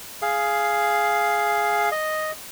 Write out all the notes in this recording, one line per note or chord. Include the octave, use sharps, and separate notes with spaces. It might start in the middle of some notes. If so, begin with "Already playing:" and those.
G#4 F5
D#5